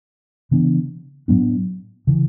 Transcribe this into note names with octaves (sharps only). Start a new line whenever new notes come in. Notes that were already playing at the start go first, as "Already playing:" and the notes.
C#3 E3 B3 D4
A2 F#3 B3 D4
C#3 E3